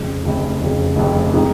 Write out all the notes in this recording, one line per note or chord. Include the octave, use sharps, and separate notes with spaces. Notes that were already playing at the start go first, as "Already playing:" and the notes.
Already playing: F1 F2 C#3
F1 F2 C#3
F1 F2 C#3
F1 F2 C#3
C3 F3 G#3 D#4